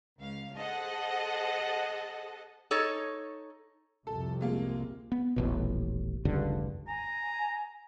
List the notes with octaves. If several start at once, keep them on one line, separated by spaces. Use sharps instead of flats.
C#2 F5
G#4 A4 C5 D#5 F#5 A5
D#4 A4 C#5
C2 F2 C3 A4
G#3 A#3 F4
B3
D#1 A1 B2
F1 C#2 G2 D3
G#5 A#5